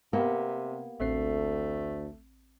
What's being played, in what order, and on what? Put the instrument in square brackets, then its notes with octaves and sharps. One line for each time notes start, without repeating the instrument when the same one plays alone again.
[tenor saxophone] C3 [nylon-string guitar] A#3 B3 G4
[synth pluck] A1 C4 C7 [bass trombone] D2 [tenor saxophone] A3